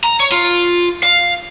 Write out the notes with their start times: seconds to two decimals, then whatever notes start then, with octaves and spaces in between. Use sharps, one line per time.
0.04 A#5
0.20 C#5
0.32 F4
1.03 F5